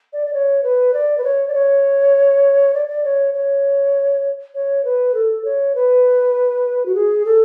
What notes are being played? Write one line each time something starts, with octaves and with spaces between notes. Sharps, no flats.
D5
D5
C#5
B4
D5
B4
C#5
D5
C#5
D5
D5
C#5
C#5
C#5
B4
A4
C#5
B4
F#4
G#4
A4